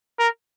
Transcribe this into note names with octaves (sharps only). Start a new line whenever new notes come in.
A#4